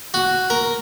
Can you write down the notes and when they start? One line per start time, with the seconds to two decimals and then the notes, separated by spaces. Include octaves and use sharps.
0.14 F#4
0.50 A#4